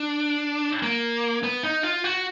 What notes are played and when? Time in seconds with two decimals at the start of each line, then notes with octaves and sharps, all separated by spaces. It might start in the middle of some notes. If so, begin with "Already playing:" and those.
Already playing: D4
0.83 A#3
1.43 B3
1.63 D#4
1.83 F4
2.04 F#4